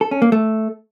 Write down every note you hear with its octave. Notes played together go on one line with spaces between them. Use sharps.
A4
C#4
A#3
A3